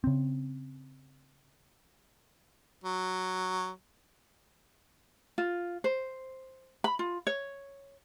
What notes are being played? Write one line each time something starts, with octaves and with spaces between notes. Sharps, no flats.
C#3 C4
F#3
F4
C5
B5
F4
C#5